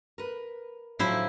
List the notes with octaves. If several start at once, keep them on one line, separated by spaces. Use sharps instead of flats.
A#4 B4
A2 D#3 F3 F#3 E4 C5